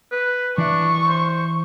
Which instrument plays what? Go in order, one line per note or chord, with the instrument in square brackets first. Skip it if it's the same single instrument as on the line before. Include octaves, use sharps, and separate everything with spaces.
[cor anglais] B4
[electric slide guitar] E3 E4 E5 [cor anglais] D4 [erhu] C#6
[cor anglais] C5